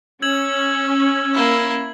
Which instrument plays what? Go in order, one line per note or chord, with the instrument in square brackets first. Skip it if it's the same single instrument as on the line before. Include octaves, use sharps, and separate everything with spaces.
[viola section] C#4 [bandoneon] E6 [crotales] G#6 F#7
[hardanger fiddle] A#3 E4